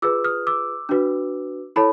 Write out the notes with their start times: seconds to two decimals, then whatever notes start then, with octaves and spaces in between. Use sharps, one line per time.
0.02 F4 G#4 B4 D6 E6
0.24 D#6 F6
0.47 D6 E6
0.89 D4 F#4 B4
1.76 E4 A4 C#5 A5 B5